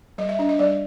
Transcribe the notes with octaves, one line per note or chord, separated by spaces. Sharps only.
G3 D#5
E5
D4 D#5
D#5
G3 D5